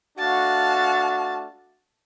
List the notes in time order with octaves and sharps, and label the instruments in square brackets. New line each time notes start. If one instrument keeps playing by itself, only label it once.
[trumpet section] A3 D4 F#4 [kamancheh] F5 A5